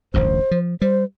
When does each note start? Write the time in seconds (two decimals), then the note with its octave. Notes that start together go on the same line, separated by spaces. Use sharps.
0.14 D1 A1 G2 C5
0.51 F3
0.82 G3 C5